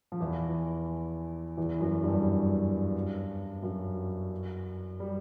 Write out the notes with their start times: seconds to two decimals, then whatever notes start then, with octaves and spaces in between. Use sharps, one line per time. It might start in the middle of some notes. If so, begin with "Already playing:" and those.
0.12 F3
0.21 E2 E3
1.57 E2 E3
1.80 F#2 F#3
2.03 G2 G3
3.63 F#2 F#3
5.00 G3